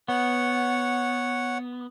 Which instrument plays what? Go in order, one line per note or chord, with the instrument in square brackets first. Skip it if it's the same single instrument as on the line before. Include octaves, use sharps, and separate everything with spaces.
[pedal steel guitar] B3 [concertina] C#5 F#5